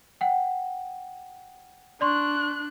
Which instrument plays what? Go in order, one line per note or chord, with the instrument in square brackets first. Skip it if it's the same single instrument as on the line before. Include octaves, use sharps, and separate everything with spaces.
[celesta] F#5 G5
[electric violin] D4 F#6 [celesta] D5 C6 C#6